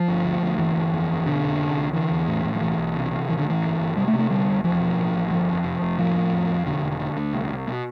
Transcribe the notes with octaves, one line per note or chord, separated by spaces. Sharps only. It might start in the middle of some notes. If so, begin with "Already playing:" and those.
Already playing: F3
G1
D2
D2
G1 E3
G1
F2
G1
B2 D3
F1
C3
C2
D3 E3
E2
A2
A2
F3
B1 E3
B1
C3
C3
A1 E3
D3
A2 E3
G1
G1
C3 G3
A3
C3
A3
D3 G3
F1
E2 F3
B2
A1
A1
G1 F3
F2
F1
F1
A2 F3
A2
F2
F2
E1 D3
E1
D3
D2
C2
C2
B2